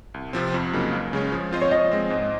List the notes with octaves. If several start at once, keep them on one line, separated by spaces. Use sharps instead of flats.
C2
C3 F3 C4
F2
C#3 F#3 A#3 D#4
C#2
C#3 G#3 C#4
F3
C4 F4 C5 D#5
C#5
F3 D#5
G#3 C4
G#2